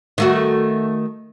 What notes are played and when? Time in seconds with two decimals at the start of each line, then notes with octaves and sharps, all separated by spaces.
0.18 D#3 A3 F#4